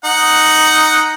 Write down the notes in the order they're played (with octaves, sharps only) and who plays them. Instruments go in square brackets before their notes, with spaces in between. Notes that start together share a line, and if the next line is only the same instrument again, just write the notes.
[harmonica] D#4 F#5